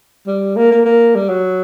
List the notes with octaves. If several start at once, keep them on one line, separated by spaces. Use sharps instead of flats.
G3
A#3
A#3
A#3
G3
F#3